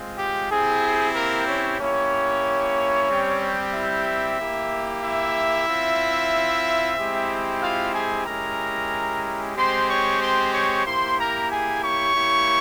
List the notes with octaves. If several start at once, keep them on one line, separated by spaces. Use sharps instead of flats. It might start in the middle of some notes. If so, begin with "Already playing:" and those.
Already playing: G#3 C4 F4
G4
C4 E4 G4 G#4
A#3 A#4
C#4 C#5
A#3 C#4 E4 G4 C#5
G3 C4 G4
E4 E5
A#3 E4 G4
E4 E5
C4 F4
G#3 C4 E4 G4
F4 F5
G#4 G#5
G#3 C#4 E4 G4 A#4 A#5
G#3 C4 G4 C5 C6
C#5 C#6
C5 C6
C#5 C#6
A#3 E4 G4 C5 C6
A#4 A#5
G#4 G#5
C#5 C#6
A#3 E4 G4